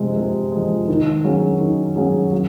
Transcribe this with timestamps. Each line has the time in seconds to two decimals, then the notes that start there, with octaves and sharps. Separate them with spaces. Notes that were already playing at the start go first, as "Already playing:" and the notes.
Already playing: C3 F3 G#3
0.16 C3
0.52 F3 G#3
0.88 D#3
1.24 F#3 C#4 G#4
1.60 D#3
1.96 F#3 C#4 G#4
2.32 F#3